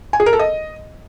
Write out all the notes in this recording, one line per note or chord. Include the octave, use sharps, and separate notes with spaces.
G#5
G#4
A#4
A4
D#5